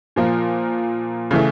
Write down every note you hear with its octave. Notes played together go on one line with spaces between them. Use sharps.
A#2 F3 A#3
C#3 E3 A3